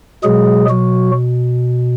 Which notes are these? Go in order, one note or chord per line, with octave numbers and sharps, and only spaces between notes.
B2 F#3 G#3 G#4
F#3 F#4